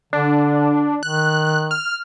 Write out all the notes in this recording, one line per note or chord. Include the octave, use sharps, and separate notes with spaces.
D3 D4
D#3 F#6
F6